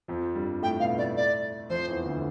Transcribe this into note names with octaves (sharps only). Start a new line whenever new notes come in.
F2 F3
G2 G3
G3
A2 A3 G5
B2 B3 F5
A2 A3 D5
D5
F2 F3 C5
E2 E3
D2 D3